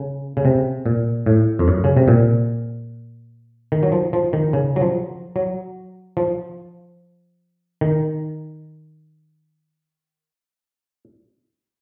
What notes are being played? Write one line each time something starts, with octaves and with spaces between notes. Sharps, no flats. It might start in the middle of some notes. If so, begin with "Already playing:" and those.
Already playing: C#3
C#3
C3
A#2
A2
F2
F#2
C#3
C3
A#2
D#3
F#3
F3
F3
D#3
C#3
F#3
F3
F#3
F3
D#3